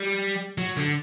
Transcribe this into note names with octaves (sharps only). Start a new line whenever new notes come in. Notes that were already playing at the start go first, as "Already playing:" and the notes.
Already playing: G3
F#3
D3